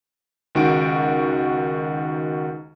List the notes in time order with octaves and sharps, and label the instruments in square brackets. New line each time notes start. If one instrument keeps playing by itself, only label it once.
[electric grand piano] C#2 D#3 F#4 C#6 D7